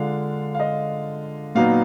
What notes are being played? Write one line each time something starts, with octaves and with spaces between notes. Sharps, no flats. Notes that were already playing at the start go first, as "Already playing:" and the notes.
Already playing: D3 G#3 D4 F4 F5
F5
D#5
A#2 F#3 B3 D#4 F5